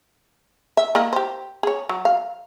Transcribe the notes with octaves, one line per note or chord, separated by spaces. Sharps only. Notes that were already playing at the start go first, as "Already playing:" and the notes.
E5
A#3 E4 D#5
G4 C5
G#4 C#5
F#3
F5